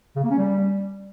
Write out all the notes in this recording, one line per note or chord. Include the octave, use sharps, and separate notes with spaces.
C#3
A#3
C#4
G3